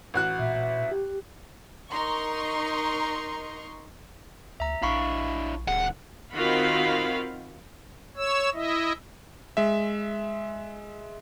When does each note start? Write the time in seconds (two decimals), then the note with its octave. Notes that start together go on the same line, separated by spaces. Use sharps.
0.14 A1 F#4 F#6
0.39 A#2 E5
0.91 G4
1.89 D#4 A#4 A#5 C6 C#6
4.60 D2 E5 A#5
4.82 A#1 D4 E4 F5 B5 C#6
5.68 D1 D#2 G#3 F#5
6.34 D#3 C4 F4 F#4 F5 B5
8.17 C#5 E6
8.54 E4 D#5 E5
9.57 G#3 E5